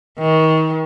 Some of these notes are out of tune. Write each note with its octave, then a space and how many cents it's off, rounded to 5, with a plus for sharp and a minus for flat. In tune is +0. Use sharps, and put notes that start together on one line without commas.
D#3 +35